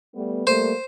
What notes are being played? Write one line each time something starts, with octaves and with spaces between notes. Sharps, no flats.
G3 A3 B3
G3 A3 A#3 C5